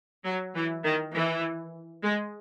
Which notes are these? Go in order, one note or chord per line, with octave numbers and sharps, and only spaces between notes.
F#3
E3
D#3
E3
G#3